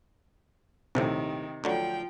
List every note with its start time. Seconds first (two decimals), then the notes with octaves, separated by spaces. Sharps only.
0.95 A#1 D#2 A2 C3 D#3
1.64 D2 D3 F3 F#3 G5